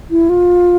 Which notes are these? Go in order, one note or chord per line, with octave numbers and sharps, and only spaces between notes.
E4
F4